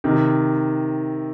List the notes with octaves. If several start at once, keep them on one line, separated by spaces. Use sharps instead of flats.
C3 D#3